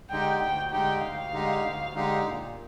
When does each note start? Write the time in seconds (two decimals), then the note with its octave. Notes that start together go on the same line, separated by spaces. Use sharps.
0.10 D3 G#3 D#4 G4 G5
0.40 D2 G5
0.71 D3 G#3 D#4 G4 G5
1.02 D2 F5
1.32 D3 G#3 D#4 G4
1.63 D2
1.93 D3 G#3 D#4 G4
2.25 A#2